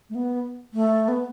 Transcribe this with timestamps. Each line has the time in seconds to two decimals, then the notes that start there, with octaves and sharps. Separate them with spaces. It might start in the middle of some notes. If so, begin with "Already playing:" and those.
0.10 A3
0.15 B3
0.74 A3
1.08 B3